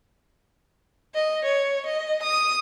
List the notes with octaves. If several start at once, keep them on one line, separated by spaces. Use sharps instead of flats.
D#5
C#5
D#5
D#6